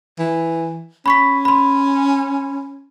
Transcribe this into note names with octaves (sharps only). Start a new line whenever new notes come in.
E3
C#4 B5 C#6 B6
B5 C6